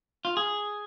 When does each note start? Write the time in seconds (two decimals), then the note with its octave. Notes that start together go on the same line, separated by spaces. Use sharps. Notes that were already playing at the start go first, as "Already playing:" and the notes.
0.25 F4
0.37 G#4